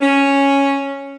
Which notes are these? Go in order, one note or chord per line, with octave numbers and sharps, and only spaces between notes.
C#4